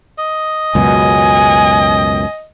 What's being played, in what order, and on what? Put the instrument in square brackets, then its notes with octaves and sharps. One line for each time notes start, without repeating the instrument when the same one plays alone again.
[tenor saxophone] D#5
[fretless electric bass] C#2 F#2 B2 [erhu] G#5